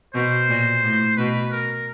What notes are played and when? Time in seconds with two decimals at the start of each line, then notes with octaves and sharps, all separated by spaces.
0.14 B2 C5
0.49 A#2
0.82 A2
1.17 B2 B4
1.51 A#4